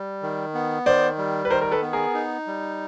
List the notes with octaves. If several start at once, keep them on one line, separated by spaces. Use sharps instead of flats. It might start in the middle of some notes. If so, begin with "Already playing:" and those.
Already playing: G3
D#3
B3
D#3 C5 D5
G3
B4
D#3 A#4 C5
A#4
A4 B4
B3
G#4 A#4
D#4
G3